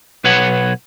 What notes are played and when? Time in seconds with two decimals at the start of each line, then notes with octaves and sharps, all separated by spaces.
0.24 B1 B4 C#5 F#5